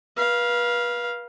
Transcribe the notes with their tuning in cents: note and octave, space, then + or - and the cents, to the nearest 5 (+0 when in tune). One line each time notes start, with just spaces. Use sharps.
B4 -35 F5 +0